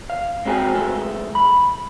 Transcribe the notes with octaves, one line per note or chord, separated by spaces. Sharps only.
F5
G#3 C4 E4 F#4 G5 G#5
B1 E2 G#3 A3 A4
B5